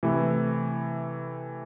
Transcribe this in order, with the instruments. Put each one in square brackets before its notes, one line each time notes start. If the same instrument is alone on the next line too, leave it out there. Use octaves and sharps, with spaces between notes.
[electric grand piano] C3 E3 A3 E4 B4